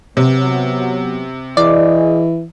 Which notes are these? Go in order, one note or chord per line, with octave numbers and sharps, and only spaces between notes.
C3 F#3 B3
E3 G#4 D5 D#5